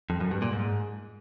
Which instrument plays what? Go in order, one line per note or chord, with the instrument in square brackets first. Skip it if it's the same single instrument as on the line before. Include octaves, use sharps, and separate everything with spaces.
[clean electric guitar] F2
F#2
G2
A#2
G#2